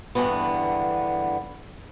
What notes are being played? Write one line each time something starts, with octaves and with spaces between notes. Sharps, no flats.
E2 G2 D3 B3